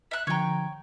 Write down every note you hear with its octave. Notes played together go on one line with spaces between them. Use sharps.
E5 F#6
D3 F3 C#5 G5 A#5